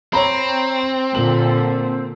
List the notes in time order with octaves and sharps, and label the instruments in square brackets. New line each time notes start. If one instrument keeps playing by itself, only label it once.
[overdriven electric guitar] C4 [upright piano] C#5 A#5 B5
[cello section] A#2 D3 [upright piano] A#3 F#7